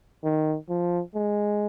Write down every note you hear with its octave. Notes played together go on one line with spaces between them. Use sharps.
D#3
F3
G#3